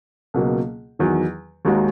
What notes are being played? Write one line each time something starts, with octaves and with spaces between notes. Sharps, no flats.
C#2 B2 F#3 A#3
E2 D#3 F#3
D#2 D#3 G#3 D#4 F#4